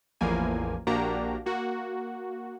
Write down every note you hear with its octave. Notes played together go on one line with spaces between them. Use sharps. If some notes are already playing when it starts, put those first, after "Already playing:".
A1 E2 E3 F3 A#3 G#5
A#1 A#3 D4 F#4 G4 A#5
A#3 F#4